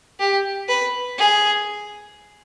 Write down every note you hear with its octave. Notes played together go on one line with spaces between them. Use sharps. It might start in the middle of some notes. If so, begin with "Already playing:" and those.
G4
B4
G#4